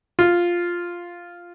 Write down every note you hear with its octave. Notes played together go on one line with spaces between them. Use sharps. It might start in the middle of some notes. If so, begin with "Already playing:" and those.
F4